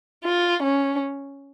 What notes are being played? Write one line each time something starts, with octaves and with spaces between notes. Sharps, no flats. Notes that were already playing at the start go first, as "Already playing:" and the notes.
F4
C#4